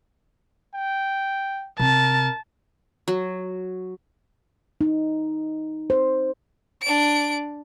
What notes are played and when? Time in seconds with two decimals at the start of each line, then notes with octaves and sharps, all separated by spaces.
0.75 G5
1.80 C3 A#4 A5
3.08 F#3
4.81 D#4
5.90 C5
6.83 D4 D7